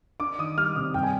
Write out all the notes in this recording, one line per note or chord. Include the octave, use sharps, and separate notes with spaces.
D4 D6
D#3 D#6
G3 F6
C3 D#6
G2 G5
G#5